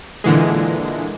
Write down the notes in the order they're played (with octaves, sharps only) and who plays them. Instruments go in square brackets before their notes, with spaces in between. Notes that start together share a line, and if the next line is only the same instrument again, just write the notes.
[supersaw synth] A#2 D3 E3 G#3